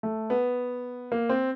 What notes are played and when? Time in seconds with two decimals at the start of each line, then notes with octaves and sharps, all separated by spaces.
0.03 A3
0.30 B3
1.12 A#3
1.29 C4